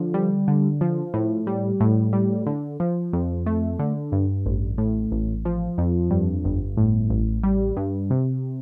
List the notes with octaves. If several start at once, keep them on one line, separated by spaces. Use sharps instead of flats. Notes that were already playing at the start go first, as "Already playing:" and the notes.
Already playing: D3 F3
G3
D3
F3
A2
G3
A2
G3
D3
F3
F2
A3
D3
G2
A1
A2
A1
F3
F2
G2
G1
A2
A1
G3
G2
C3